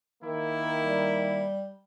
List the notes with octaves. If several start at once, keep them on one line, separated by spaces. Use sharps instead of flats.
D#3 A#3 E4
G3